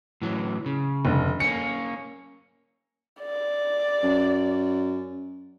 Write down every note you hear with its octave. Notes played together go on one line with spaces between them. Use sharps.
A2 E3 F#3
C#3
F1 D3
A#3 C#4 C#7
D5
F#2